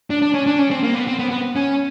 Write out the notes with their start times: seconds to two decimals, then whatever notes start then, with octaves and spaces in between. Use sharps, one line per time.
0.10 D4
0.22 D4
0.34 C#4
0.46 D4
0.58 C#4
0.71 C4
0.83 A#3
0.94 B3
1.07 C4
1.19 B3
1.31 B3
1.56 C#4